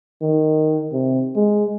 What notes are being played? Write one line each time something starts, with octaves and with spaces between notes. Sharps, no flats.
D#3
C3
G#3